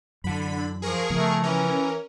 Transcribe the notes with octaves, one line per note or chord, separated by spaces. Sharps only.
F#2 D3 E3 F#3 B5
F3 G#4 A#4 C#6
C#3 F3 A3 B3
E3 C#4 A#4